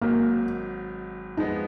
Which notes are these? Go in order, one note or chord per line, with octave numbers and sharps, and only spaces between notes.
G#1 G#2 F#3 A#3
F2 F3 G#3 B3 D#4